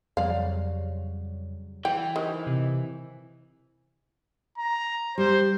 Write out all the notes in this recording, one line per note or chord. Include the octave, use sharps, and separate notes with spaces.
F2 C#3 F#3 G3 D5 F5
E3 G5
D#3 G4 C5
C3
A#5
G3 C5